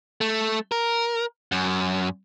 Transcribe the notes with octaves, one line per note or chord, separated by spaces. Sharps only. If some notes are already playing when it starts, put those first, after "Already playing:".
A3
A#4
F#2